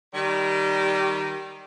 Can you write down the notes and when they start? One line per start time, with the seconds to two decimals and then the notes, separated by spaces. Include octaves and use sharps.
0.14 D#3 G3